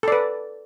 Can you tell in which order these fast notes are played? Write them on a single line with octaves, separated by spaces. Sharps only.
A4 D5 B4